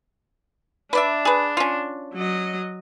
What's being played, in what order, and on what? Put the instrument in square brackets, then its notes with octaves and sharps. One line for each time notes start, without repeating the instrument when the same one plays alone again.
[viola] D4 [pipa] B4 D5 E5
[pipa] G#4 B4
C#4 F4
[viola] F#3 D#5